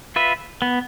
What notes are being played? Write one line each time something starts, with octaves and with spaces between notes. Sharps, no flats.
F4 B4 E5
B3